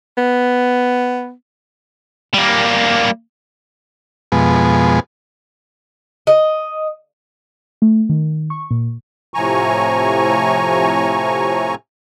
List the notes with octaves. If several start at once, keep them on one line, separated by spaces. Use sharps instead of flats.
B3
G3 A#3
F2 B2 G#3
D#5
A3
D#3
C#6
A#2
A2 C3 F3 G#5 A#5 C#6